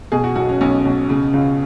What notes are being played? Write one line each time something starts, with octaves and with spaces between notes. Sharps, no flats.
B2 G#4
F#4
B1 F#4
C#4
B1 C#4
B2
C#3
C#2